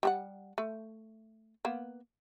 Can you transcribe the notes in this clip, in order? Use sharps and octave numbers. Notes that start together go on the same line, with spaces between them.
G3 G4 F#5
A3
A#3 B3